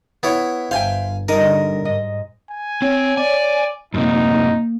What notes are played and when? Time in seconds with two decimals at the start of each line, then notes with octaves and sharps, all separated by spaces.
0.23 B3 E4 C#5
0.71 G1 C5 E5 F5 G5 G#5
1.28 D3 G3 D#4 A#4 D#5
1.85 G#2 D#5
2.51 G#5
2.82 C4 C#5
3.18 D5 G#5
3.94 F#2 C3 A#3 D#4